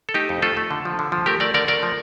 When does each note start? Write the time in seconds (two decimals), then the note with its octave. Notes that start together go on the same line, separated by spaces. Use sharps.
0.09 A4
0.14 A3 D#4 G4
0.29 F2
0.42 A3 F4 A4
0.57 A3
0.71 D3
0.85 F3
0.99 D3
1.12 F3
1.26 A3 G4 A#4
1.40 A3 A#4 D5
1.54 D3 A#4 D5
1.68 A3 A#4 D5
1.83 F3